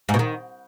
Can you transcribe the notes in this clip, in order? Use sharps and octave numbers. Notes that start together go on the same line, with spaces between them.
G#2
B2
D#3